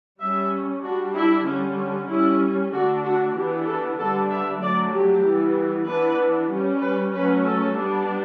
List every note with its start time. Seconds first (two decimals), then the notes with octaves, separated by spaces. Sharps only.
0.20 G3 C#4 E5
0.83 G3 D4 F#4
1.15 E4
1.47 D3 G3 C#4
2.10 G3 C#4 E4
2.72 D3 A3 D4 F#4
3.03 F#4
3.36 E3 B3 D4 G4
3.67 A4
3.98 D3 G3 B3 D4 A4
4.30 E5
4.61 F#3 A3 D4 D5
4.93 G4
5.25 E3 G3 B3
5.87 E3 B3 D4 B4
6.51 G3 C#4
6.82 B4
7.14 F#3 A3 C#4 B4
7.46 A4
7.77 G3 B3 D4